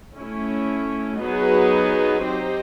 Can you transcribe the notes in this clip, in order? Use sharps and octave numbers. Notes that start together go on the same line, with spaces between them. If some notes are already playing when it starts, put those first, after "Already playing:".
A3 C#4 E4
F#3 B3 D#4 G#4 B4
C4 D#4 G4 C5